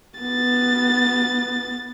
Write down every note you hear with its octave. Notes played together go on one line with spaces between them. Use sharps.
B3 A6